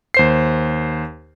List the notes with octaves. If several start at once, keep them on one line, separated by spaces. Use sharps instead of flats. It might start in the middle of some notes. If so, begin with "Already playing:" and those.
D#2 C5 C7